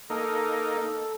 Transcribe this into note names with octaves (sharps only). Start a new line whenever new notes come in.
A#3 D#4 A4